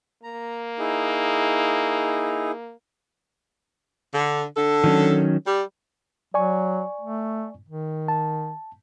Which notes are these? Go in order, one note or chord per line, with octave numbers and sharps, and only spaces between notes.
A#3 A#5
D#4 E4 G#4
D3
D3 A4
D#3 F#3 C#4
G3
F#3 D5 G#5 C#6
A3
D#3
A5